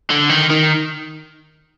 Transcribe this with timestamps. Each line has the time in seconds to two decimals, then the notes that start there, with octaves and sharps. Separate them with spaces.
0.11 D3
0.29 D#3
0.50 D#3